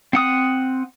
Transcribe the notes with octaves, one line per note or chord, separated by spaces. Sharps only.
C4 F#5 D#6